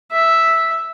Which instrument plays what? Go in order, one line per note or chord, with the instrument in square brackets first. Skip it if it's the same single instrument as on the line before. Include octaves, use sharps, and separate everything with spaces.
[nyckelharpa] E5